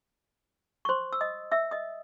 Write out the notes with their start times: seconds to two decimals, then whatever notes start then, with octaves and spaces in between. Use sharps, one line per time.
0.85 C#6
0.89 C5 C6
1.13 E6
1.21 D#5 D#6
1.51 E5 E6
1.71 D#5 D#6